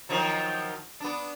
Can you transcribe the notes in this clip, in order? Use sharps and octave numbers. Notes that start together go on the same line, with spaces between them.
D#3 F3 F#3
B3 D4